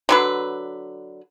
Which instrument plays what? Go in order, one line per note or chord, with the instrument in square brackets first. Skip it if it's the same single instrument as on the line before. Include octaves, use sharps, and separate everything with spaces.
[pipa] D3 F#3 B4